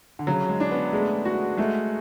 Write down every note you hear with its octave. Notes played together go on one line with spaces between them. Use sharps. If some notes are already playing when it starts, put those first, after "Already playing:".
D3
C#3 F#3
G#3
D4
B3
G#3 A3
F#4
G#3 A3